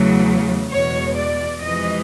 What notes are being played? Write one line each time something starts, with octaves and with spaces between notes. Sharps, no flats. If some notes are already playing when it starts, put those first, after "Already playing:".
Already playing: E2 C#3 F#3 A3
E2 B2 G#3 C#5
D5
F2 C3 E3 G#3 D#5